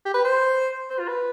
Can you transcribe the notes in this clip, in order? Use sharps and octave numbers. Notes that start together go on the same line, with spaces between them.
G4
B4
C5
C5
F4
B4